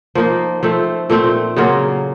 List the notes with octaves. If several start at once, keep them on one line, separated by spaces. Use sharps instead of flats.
F3 A#3 D#4
F3 A3 C4
A#2 A3 C4
C#3 F#3 A#3 F4